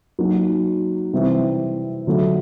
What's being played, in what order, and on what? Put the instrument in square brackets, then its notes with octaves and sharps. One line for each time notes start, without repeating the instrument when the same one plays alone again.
[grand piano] F#3 A#3 D#4 F#4
C3 E3 G3 C4
D3 F#3 A3